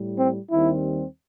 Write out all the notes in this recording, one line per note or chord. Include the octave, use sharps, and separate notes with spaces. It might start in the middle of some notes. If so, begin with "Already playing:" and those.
Already playing: A2 G3
C4
D#2 D#3 G3 C4 E4